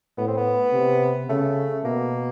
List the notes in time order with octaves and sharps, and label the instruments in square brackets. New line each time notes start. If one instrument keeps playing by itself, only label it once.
[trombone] A2 [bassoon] B3
[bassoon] C4
B3
[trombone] C3
[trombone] C#3 [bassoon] A3
[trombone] B2 [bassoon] A#3